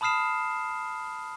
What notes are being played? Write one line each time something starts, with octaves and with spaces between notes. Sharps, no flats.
A5 B5 D#6 F6 C7 E7